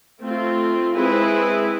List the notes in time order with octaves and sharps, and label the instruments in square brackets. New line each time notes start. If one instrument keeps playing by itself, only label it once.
[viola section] A3 C4 F4
G#3 C4 E4 G#4 B4